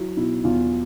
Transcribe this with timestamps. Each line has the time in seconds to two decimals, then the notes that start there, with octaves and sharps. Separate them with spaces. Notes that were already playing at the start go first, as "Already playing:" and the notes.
Already playing: F#3 E4
0.17 B2 E4
0.44 E2 F4